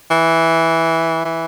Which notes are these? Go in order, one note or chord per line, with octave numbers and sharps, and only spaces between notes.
E3
E3